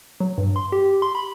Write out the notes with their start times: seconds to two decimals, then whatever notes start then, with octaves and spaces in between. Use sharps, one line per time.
0.20 F#3
0.38 G2
0.56 C6
0.72 G4
1.02 C6
1.15 B5